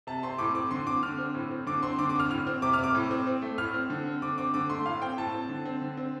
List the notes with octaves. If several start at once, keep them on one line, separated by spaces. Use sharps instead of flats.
C3 A5
C4 C6
A2 D6
C4 D6
D3 C6
C4 D6
D3 F6
C4
A2
C4
D3 D6
C4 C6
D3 D6
D6
C4 F6
A2 F6
C4
C3 D6
F6
C4 D6
A2
C4
C4
A3
A2 F6
C4
D3
C4
D3 D6
C4 D6
D3 D6
A3 C6
A2 F5
C4 G5
A2 A5
C4
D3
C4
D3
C4